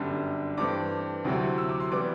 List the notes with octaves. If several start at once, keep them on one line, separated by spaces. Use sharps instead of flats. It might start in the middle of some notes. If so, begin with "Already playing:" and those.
Already playing: G1 F#2 D3 G3
G2 E3 A3 C4 D6
D2 C3 F#3 C4 E4
E6
D6
C6
E3 G3 B3 D6